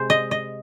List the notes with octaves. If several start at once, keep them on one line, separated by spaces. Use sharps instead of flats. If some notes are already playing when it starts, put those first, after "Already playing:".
Already playing: C3 G#3 C5
D#5
D#5